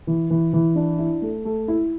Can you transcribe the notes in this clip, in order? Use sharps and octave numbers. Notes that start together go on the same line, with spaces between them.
E3
E3
E3
D4
E4
A3
A3
E4